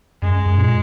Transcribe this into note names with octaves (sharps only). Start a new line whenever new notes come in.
F#2 G#3
F#2
A#2